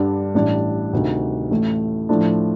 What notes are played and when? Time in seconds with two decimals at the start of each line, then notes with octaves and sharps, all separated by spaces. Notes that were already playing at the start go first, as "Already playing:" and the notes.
Already playing: G2 D3 G3 D4
0.35 A1 A2 G3 D4
0.93 D2 C3 D#3
1.50 A1 A2 A3
2.09 A2 F3 A3 D4